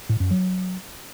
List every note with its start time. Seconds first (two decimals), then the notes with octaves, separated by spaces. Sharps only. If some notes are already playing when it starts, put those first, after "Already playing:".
0.09 A2
0.20 F#2
0.31 F#3